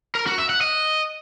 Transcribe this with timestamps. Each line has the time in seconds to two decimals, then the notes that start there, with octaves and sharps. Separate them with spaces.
0.15 A#4
0.27 F#4
0.38 E5
0.50 F#5
0.61 D#5